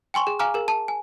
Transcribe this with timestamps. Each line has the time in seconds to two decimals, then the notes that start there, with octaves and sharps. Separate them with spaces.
0.14 G5 G#5 C6 C#6
0.27 G#4
0.39 F5 G#5 A#5 D6 F6
0.54 G#4 A#4
0.68 A5
0.88 G#5